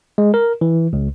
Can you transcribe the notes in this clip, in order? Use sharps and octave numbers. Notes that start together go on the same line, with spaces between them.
G#3
A#4
E3
C#2